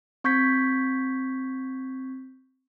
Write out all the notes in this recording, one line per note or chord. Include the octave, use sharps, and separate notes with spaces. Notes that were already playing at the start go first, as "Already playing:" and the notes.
C4 C#6 G6 G#6 B6